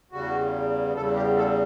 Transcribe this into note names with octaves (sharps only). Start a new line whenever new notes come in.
E2 C#3 G3 F#4
E2 C#3 G3 A4
G4
A4